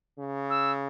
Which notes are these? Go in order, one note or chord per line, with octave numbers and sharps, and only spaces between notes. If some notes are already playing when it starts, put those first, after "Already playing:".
C#3
E6